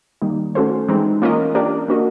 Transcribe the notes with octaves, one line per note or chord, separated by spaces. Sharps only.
D#3 G3 A#3 D#4
A3 C#4 F#4 A4 C5
E3 G#3 C4 D#4
A#3 C#4 F4 A#4 D#5
A#3 D4 G4 A#4 D5
A#3 D4 F#4 A#4 D#5